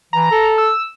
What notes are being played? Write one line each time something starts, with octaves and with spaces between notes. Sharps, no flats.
E3 A#5
A4
E6